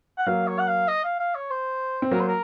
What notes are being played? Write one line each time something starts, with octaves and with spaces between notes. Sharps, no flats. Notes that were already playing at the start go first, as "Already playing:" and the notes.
F#5
F#3 A#3 F5
C#5
F#5
F5
D#5
F5
F5
C#5
C5
C4
F#3 A#3 A#4
C5
A#4